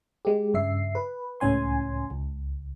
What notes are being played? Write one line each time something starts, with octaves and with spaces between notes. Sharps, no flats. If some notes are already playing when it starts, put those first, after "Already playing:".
G#3 G4
G2 C#3 E5 C7
B4
C#2 A2 C#4 G#5 C6
C#2